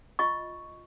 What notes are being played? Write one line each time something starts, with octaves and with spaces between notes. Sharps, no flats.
F4 D#5 C#6